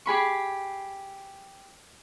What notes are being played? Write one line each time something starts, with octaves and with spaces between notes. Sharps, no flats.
G4 G#4 B5 C#6